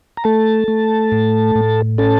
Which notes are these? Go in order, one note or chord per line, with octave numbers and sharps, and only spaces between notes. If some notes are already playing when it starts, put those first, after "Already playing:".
A#5
A3 A4 A5
A3
A2
A2
C#4 A4 A5